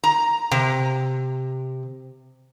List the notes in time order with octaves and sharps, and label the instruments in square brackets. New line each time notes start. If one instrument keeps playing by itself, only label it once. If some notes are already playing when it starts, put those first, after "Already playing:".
[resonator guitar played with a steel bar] A#5
C3